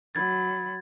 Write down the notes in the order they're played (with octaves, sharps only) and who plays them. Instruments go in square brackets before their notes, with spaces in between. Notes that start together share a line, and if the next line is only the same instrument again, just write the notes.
[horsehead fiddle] F#3 B5 [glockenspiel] G#6 A6